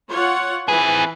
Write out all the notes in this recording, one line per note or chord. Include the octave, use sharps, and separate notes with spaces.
F4 C#5 F#5
E3 C4 G#4 B4